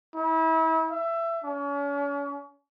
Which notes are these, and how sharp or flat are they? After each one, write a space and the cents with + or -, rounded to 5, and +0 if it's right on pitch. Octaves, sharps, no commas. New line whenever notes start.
E4 -35
E5 +20
C#4 +40